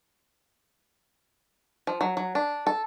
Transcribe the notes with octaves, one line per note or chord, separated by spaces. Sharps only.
F3
F#3
F#3
D4
A4